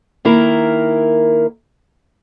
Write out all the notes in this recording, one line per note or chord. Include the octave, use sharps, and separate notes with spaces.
D#3 A#3 E4 A#4